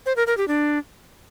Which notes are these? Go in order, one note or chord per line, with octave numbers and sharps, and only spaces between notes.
C5
A#4
A#4
G4
D4